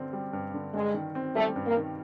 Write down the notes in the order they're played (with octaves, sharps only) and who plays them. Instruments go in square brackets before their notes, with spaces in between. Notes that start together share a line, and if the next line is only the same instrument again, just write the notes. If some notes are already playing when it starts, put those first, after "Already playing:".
Already playing: [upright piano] G2 D3 C4
G3
G2
D3
[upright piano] G2 [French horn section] G#3
[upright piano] D#3
C4
[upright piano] G3 [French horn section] A3
[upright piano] G2
[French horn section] A#3
[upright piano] D#3